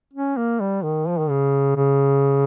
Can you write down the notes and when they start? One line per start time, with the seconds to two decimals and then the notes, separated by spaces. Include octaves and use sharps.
0.13 C#4
0.37 A#3
0.60 G3
0.83 D#3
1.08 F3
1.19 D#3
1.30 C#3
1.76 C#3